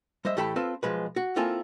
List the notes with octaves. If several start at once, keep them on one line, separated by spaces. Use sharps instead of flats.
G3 C5 D#5 E5
A2 E3 G4 A4 A5 B5
C4 F4 A4 B4
B1 F3 G#3 B4
F#4
A#3 C4 E4 F4 A4 G#5